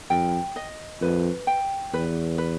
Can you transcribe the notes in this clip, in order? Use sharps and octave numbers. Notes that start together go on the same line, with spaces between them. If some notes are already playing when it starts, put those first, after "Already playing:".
F2 G5
D#5
F2 B4
G5
E2 B4
B4